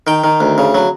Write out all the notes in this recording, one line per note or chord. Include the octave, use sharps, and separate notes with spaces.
D#3 G5
D#3
D2
C#3
F#3